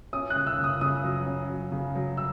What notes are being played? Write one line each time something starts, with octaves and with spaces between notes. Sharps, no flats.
C#4 D#6
F#6
C#3
E6
C#3
D#6
C#3 D#6
F#3
C#4
F#3
C#3
F#3
E6